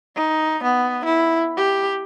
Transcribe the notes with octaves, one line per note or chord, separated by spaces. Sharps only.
D#4
B3
E4
G4